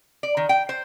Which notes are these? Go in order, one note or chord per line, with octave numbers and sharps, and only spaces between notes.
D5
D#3
G5
C5